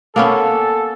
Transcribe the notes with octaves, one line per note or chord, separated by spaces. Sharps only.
A#3 B3 C#4 A4